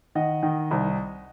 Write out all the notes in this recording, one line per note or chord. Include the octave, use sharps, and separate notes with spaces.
D#3 D#5 F#5
D#3
C2